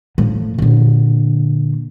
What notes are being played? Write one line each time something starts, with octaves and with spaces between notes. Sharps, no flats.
A2 F3
A#2 D3